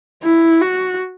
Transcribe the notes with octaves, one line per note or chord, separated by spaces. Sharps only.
E4
F#4